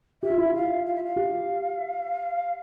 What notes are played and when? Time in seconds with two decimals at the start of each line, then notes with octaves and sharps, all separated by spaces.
0.22 G4 E5
0.30 F4
0.38 E4
0.45 F4
0.54 F5
0.85 F5
0.94 E5
1.03 F5
1.16 G4